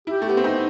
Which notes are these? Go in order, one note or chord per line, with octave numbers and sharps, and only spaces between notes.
E4 G4
A3
B3
C4
D#4